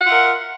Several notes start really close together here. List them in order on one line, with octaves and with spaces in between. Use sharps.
F#5 F4 E5 A#4